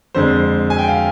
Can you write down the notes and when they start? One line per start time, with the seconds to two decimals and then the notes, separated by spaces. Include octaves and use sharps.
0.15 F2 D3 G#3 C5
0.70 G#5
0.79 G5
0.88 F5